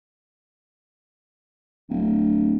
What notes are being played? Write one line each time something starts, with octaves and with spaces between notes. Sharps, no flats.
D1